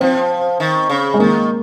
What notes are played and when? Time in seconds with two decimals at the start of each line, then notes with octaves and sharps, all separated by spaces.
0.01 F3 C4
0.60 D#3
0.89 C#3
1.14 G#3
1.19 D#3 A#3